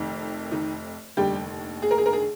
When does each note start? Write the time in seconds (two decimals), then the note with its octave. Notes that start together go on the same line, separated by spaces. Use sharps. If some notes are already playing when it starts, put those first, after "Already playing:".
Already playing: F1 F2 D#3
0.51 D#3 D#4
1.17 F1 D#2 D3 G3 G4
1.82 G#4
1.91 A#4
1.98 G#4
2.06 A#4
2.13 G#4